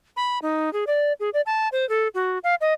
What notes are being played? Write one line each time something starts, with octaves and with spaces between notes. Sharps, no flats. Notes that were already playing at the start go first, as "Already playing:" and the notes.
B5
D#4
G#4
D5
G#4
D5
A5
C5
A4
F#4
F5
D#5